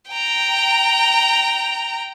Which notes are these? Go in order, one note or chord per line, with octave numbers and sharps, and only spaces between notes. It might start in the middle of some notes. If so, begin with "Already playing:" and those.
G5 A#5